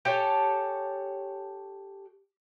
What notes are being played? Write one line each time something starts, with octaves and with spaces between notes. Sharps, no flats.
G4 A4 C#5 G#5